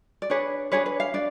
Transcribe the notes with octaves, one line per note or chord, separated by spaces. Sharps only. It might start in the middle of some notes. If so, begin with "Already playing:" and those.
D5
D4 G#4 B4 C#5
D4 G#4 B4 C#5
B4
F5
D4 D5